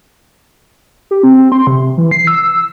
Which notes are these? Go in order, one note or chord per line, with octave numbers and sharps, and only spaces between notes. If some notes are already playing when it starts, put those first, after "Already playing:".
G4
C4
C6
C3
E3
C7
E6